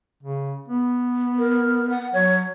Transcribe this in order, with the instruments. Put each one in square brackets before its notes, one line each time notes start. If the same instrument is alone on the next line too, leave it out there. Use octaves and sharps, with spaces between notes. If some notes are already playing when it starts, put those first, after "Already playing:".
[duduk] C#3
B3
[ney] A#4
F#5
[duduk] F#3 [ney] C#5